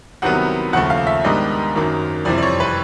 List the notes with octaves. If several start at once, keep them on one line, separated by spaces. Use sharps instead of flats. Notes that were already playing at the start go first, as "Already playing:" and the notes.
C2 C3 D#3 F#3 B3 F#5
D#2 C#3 F3 A3 F#5
F5
E5
G#2 D#3 G3 B3 D4 D#5
F#2 D#3 F#3 A#3
F2 C3 E3 G3 C4 D5
D5
C#5
B4